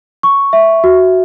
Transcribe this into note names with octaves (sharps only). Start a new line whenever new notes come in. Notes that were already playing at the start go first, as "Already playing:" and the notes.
C#6
E5
F#4